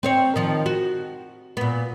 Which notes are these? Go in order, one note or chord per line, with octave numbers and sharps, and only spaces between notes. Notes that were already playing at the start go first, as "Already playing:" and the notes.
C4 C5 C#5
D#3 F3
F#4
A#2 B3